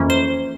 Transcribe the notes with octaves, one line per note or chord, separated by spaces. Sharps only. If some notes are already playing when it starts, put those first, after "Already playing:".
Already playing: F2 E3 A#3 C#4
C5